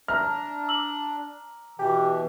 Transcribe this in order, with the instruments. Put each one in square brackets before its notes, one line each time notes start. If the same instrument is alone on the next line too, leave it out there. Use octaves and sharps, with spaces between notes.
[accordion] D4 [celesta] E5 [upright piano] A#5 F6
[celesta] D6 E6 F#7
[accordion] B2 E3 [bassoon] G4 [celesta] G#5